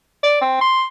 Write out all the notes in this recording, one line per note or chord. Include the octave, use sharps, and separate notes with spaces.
D5
C4
C6